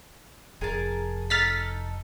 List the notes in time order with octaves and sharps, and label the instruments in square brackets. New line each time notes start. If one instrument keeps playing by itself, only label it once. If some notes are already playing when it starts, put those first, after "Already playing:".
[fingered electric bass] F1 [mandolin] G#4 A#4 A5
[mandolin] D#4 A4 A#5 [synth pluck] F6 A6 B6